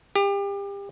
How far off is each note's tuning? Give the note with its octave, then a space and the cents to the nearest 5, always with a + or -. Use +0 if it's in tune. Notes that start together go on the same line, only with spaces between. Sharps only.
G4 +30